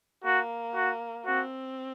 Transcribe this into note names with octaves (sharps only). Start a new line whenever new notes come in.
A#3 F#4
F#4
C4 F#4